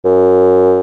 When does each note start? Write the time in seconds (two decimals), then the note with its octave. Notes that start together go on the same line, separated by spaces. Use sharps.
0.05 F#2